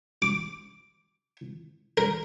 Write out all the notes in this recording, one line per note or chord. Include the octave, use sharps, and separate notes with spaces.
D6
A#4